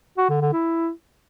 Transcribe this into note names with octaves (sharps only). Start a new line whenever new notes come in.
F#4
D3
D3
E4